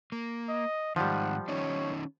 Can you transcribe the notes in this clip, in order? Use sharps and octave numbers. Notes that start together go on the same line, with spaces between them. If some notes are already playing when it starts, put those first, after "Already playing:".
A#3
D#5
G#2 D#3 F3 G3 F#5
D#3 C#4 D#4 C#5